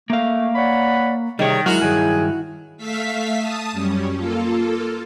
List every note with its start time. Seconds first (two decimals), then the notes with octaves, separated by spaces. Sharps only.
0.10 A3 A#3 F5
0.55 C#5 D5 F#5 B5
1.39 C3 D#3 G3 G#4 C#5
1.66 F#3 G#3 E4 F#4 A#4 F6
1.82 G2 D#3 F#3 G#4 G#5
2.77 A3 E5 F5 B6
3.38 A5 D#6
3.72 F#2 G3 C#4
4.14 A#3 F4 A4